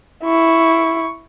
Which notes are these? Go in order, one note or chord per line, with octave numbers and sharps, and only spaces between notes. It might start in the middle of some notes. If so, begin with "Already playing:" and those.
E4 C#6